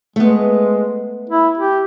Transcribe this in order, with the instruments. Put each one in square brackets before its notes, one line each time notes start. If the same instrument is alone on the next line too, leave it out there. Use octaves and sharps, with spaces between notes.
[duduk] G#3 [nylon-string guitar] A3 B3
[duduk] E4
G4